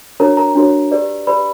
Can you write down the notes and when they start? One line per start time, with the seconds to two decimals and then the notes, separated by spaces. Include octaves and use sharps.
0.20 D4 F#4 A#4 C#5 A#5
0.37 A#4 A#5
0.55 D4 F#4 A#4 C#5
0.91 G4 B4 D5
1.27 G4 B4 D5 B5